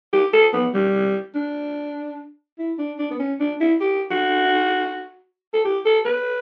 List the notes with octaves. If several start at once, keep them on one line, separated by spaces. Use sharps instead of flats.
G4
A4
B3
G3
D4
E4
D4
D4
B3
C#4
D4
E4
G4
F#4
A4
G4
A4
B4